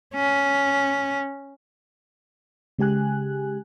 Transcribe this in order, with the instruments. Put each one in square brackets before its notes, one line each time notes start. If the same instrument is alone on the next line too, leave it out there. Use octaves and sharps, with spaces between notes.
[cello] C#4
[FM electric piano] C#3 G#3 G4 G#5 F#6